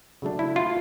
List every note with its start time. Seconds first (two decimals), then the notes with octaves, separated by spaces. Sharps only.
0.22 C#3 F#3 A3 D4
0.39 E4
0.56 F4